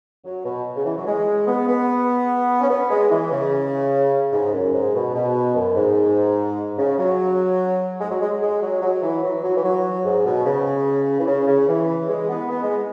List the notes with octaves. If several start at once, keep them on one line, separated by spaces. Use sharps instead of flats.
F#3
B2
C#3
E3
F#3
G#3
B3
B3
C#4
B3
G#3
E3
C#3
G#2
F#2
G#2
B2
B2
F#2
G#2
C#3
F#3
G#3
F#3
G#3
G#3
F#3
F#3
E3
F#3
F#3
E3
F#3
G#2
B2
C#3
E3
C#3
C#3
E3
G#3
B3
B3
G#3